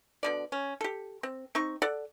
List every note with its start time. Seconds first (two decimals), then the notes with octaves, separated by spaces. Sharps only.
0.23 B2 D3 D5
0.52 C#4
0.81 G4 A4
1.23 C4
1.55 C4 D#4 C#6
1.82 A4 D5 F#5